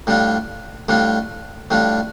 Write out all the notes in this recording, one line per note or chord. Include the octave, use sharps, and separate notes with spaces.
A2 G3 D4 F4
A2 G3 D4 F4
A2 G3 D4 F4